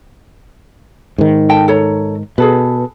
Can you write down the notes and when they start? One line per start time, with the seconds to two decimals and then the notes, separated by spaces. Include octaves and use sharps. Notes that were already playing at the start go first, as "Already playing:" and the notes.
1.18 G#2 D#3
1.49 A4 G5 A5
1.68 A4 C#5 A#5
2.38 B2 G#4 A4 B4